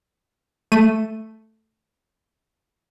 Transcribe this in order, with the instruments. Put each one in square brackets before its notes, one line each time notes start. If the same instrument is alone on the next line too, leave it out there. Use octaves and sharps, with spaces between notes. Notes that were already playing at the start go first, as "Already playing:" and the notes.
[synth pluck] A3 D#7